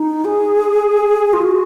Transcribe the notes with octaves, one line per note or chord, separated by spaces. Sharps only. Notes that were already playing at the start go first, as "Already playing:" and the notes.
Already playing: D#4
G#4
F4
F#4